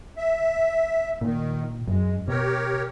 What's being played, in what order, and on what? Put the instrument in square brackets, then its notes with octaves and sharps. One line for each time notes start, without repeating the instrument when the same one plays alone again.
[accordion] E5
[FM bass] A#2 [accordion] D#3
[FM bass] F#2 [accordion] G#3
[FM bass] B2 [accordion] G4 A#4 C#5